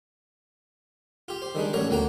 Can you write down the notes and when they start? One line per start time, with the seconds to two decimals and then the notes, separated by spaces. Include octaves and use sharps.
1.28 F4 G4
1.42 C5
1.55 D#3 G3 G#3 D4
1.73 A1 F#3 A#4 C#5 A#5
1.90 D2 A#3 F#4 G5 A#5